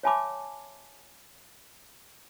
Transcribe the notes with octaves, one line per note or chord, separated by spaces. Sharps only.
C#5 E5 G#5 A5 B5 D6